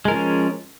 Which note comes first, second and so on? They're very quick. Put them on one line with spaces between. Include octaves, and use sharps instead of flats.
G#3 A#4 F3 C#4